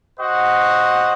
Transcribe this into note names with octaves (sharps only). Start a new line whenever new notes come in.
F#4 C5 D#5 F#5